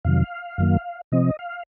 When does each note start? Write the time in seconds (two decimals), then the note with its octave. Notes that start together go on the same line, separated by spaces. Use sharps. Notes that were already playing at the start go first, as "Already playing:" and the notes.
0.05 F2 C3 D#3 F#3 F5
0.58 F#2 D#3 F#3 A#3
1.12 C3 F3 C4 D#5
1.39 F5